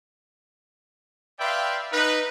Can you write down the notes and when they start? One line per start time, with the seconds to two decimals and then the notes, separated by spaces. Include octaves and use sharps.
1.40 B4 D5 E5 F5 G5 C6
1.92 D#4 B4